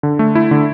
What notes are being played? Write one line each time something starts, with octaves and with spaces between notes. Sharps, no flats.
D3
A3
E4
D3